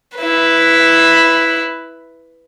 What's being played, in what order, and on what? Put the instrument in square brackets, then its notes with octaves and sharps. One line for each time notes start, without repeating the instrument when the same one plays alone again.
[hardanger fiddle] E4 B4